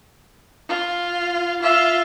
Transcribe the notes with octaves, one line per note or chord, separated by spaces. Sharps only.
F4
F4 E5